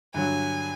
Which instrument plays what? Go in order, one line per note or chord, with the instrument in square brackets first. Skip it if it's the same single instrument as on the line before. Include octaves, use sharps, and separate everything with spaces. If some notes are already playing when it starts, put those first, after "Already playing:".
[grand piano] G2 D3 F#3 [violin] G#5